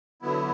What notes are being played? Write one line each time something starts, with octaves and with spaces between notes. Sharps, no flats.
D3 F#3 B3 E4